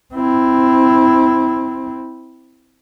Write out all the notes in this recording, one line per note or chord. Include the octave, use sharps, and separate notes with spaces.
C4 E4